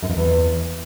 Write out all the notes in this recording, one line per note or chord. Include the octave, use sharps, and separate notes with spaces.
F#2
F2
E2